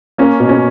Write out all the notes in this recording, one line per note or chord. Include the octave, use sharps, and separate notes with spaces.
A#3 C#4
B2
C#4